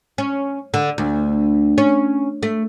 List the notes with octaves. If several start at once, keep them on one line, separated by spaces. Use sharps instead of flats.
C#4
D3
D2
C#4
A3